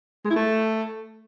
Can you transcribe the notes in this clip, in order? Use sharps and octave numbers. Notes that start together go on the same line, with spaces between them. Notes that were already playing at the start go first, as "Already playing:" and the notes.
G#3
E4
A3